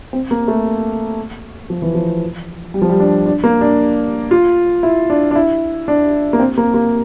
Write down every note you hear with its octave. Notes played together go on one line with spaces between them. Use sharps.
C4
A#3
A3
F3
E3
F3
G3
F3
G3
D4
D4
A#3
D4
F4
E4
D4
D4
E4
D4
A#3
C4
A#3
A#3